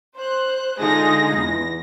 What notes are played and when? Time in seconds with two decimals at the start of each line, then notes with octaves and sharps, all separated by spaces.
0.16 C5 F#6
0.79 D3 G#3 D#4 F4 G#4 A#6
1.35 E2 A#6